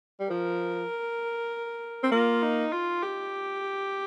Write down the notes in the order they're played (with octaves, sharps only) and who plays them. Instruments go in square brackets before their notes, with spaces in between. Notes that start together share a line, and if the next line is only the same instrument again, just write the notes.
[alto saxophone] G3
[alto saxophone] F3 [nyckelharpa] A#4
[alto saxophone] C4
[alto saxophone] A#3 [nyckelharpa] F4
[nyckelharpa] D#4
F4
G4